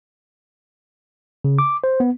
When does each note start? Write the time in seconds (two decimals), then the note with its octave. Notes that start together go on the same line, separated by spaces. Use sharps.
1.45 C#3
1.59 D6
1.84 C5
2.00 B3